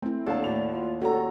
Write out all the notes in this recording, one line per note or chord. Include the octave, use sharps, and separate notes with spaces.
A3 C4 E4
D#2 D4 A4 F5 F#5 A5
A2 F#4 D5 F7
F4
C#4 F#4 G4 A4 A#5